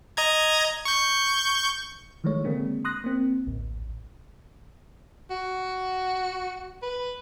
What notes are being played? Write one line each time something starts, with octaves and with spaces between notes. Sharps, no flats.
D#5 A#5 G#6
C#6 G6
D#3 E3 G#3 A3 C#5
D3 G#3 A#3 C4 D4
C6 D#6 F#6 A#6
A#3 C4
A1 D2
F#4
B4